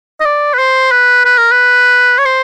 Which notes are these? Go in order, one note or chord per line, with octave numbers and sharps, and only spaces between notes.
D#5
D5
B4
C5
B4
B4
A#4
B4
C#5
C5